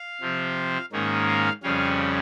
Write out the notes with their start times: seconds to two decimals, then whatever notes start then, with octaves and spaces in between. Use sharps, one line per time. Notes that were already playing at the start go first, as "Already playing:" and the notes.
Already playing: F5
0.21 C3 F3 C4
0.92 G#2 D#3 A#3 C#4
1.28 F5
1.63 F2 C#3 G3 C#4 F5